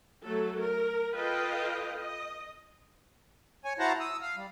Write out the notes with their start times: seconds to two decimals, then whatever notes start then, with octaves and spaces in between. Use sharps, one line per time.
0.23 F#3 A3 A4
0.60 A#4
1.15 F4 A4 B4 D#5 F5 G5
1.97 D#5
3.65 C#5 G#5
3.79 E4 F#4 C5 F#5 A5 A#5
4.00 D#6 E6
4.21 F5
4.37 G3